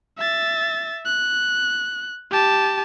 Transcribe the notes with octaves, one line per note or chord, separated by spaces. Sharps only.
E5 A6
F#6
G4 A5